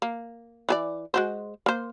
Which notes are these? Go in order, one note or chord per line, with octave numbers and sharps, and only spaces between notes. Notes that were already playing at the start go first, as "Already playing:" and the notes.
A#3
E3 G#4 D5
G#3 F#4 C5
A#3 C5